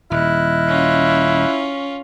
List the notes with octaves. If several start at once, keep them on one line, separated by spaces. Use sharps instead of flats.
D#1 E4 D#5 F6 F#6
C#4 F4